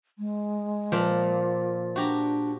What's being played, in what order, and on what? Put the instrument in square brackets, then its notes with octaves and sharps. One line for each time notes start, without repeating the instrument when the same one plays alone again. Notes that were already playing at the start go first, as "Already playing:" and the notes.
[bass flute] G#3
[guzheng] A#2 F3
[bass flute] D4 [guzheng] F#4 G4 A#5